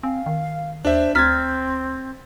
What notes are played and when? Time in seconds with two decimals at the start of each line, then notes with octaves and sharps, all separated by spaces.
0.03 C4 F5 G#5
0.26 D#3
0.85 D#2 D4 C5 E5
1.15 D2 C4 A#5 F6 G#6 A6 B6